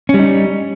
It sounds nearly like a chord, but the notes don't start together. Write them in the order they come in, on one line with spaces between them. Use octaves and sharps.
C#4 G3 D#4